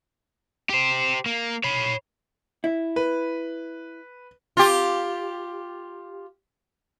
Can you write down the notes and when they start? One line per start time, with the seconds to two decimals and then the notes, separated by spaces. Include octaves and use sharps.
0.70 G4 C5
1.26 A#3
1.64 C#5 B5
2.64 E4
2.96 B4
4.57 F4 G4